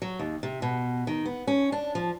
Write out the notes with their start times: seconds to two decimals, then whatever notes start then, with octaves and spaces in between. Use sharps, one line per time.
0.02 F#3
0.19 D#2
0.43 C3
0.62 B2
1.07 D#3
1.25 B3
1.47 C#4
1.72 D4
1.95 F3